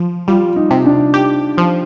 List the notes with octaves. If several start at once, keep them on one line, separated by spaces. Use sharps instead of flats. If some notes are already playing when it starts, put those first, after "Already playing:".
Already playing: F3
G3 F4
D#4
C3
D4
G4
F3